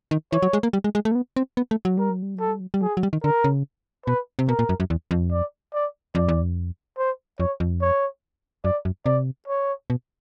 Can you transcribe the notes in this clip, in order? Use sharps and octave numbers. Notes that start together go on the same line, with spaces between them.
D#3
E3 C#5
F#3
G#3
A#3
G3
G#3
G#3
A3
A#3
B3
C4
B3
A3
F#3
G3 A#4
F#3
G3
F#3 A4
G3
F#3
G3
F#3 G#4
F#3
G3
D#3
D3 A#4
C#3
B2 B4
C3
B2 A#4
A#2
F#2
F#2
E2
F2
D5
D5
F2 D5
E2
F2
C5
F2 C#5
F2
C#5
F#2 D5
F#2
C3 D5
C#5
B2